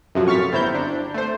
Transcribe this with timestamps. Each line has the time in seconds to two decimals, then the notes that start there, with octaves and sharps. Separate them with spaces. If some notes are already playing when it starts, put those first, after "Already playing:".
0.15 F#2 C3 F3 F#3
0.27 A2 C#6 F6 A6 B6
0.52 G1 C4 E4 A#5 G6
0.74 D4
1.14 A3 C5